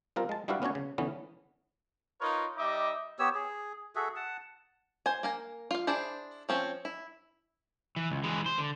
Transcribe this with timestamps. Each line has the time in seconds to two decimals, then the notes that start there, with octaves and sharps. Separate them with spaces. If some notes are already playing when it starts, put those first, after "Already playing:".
0.16 G3 C4 F4 A#4
0.29 G#3 A5
0.48 G3 D4 E4 F#4 B4 F5
0.62 B3 C#4 D4 F#4 C#5
0.75 C#3
0.98 D3 E3 B3 C#4
2.20 D#4 F4 A#4 B4 C#5
2.57 G3 D#4 D#5 E5 D6
3.19 B3 G4 C#5 E6
3.35 G#4
3.96 F#4 G#4 A4 E5
4.16 F#5 A5
5.06 C5 G#5
5.23 A#3 A#4 G#5
5.71 F4 F5
5.87 D4 E4 G#4 C5
6.49 F3 C4 C#4
6.85 E4
7.96 E3
8.10 C#2
8.24 E3 G#3
8.46 C5
8.58 D3